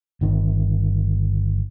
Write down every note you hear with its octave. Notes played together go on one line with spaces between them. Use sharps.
G1 D#3